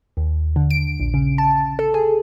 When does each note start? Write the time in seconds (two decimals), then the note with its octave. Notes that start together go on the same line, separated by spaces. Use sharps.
0.17 D#2
0.56 D3
0.70 D7
1.00 A#1
1.14 C#3
1.38 A5
1.79 A4
1.94 G#4